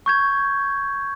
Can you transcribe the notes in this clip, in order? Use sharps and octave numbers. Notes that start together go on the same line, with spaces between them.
C#6 G6 G#6